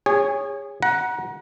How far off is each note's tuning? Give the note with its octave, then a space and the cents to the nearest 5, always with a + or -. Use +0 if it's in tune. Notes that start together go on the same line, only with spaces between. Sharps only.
G#4 -30 C#5 +0
F#5 +0 A#5 +35